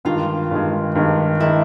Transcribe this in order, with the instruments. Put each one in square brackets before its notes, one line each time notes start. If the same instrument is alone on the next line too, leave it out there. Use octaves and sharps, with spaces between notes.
[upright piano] G2 D#3 G#3 [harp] F4
[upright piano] G2 D#3 G#3
G2 D#3 G#3
[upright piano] D#3 G#3 [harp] E4